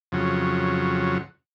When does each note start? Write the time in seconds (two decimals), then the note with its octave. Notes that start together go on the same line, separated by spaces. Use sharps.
0.12 F2 C#3 F#3